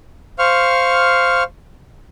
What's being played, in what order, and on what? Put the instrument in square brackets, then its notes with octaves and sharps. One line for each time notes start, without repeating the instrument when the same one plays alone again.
[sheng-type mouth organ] C5 F5 C#6 F6